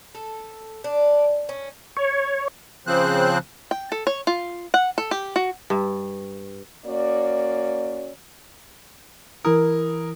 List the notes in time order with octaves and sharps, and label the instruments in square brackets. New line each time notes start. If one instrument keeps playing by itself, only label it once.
[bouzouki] A4
D4
C#4
[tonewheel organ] C#5
[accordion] C#3 F3 C4 C5 F#6
[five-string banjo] G5
A4
C#5
F4
F#5
A4
G4
F#4
[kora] G2
[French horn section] A#3 C#4 F#4 D5
[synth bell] E3 E4 D#6 [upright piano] A#4